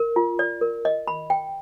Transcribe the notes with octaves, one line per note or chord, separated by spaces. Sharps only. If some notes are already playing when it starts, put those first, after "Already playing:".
Already playing: A#4
F4
D5
A#4
D#5
B5
G5